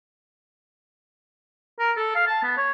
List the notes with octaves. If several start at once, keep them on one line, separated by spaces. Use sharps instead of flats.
A#4
A4
F5
A5
B3
C#5